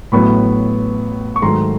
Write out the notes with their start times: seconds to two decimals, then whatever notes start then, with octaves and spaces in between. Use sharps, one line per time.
0.12 A1 A2 F#3 B3 B5 C#6
1.36 C#6
1.42 G#2 D#3 F#3 A3 A#5 C6